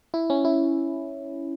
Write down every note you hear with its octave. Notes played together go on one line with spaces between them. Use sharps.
E4
C#4
E4